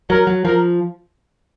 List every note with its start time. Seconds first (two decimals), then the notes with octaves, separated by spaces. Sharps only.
0.10 F#3 A#4
0.27 F#3
0.45 F3 A#4